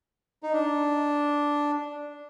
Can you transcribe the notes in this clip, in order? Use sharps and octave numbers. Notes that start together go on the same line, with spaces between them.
D#4
D4